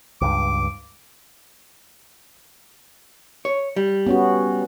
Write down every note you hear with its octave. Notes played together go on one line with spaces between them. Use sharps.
C#2 G2 D6
C#5
G3
B3 C#4 F#4